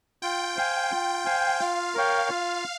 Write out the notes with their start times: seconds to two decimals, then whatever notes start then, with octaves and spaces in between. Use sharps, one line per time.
0.22 F4 G5
0.56 C5 F5 G#5
0.92 F4
1.25 C5 F5 G#5
1.61 F4 F5
1.95 A#4 C#5 G5
2.29 F4